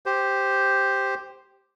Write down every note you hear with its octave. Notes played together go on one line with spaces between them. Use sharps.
G4 C5